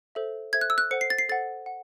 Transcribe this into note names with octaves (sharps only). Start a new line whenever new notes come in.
A4 C5 E5
A4 C5 E5 G#6
F#6
E6
F#6
A4 C5 F#5 C#7
C7
A6
C7
A4 C5 F#5 A6
F#5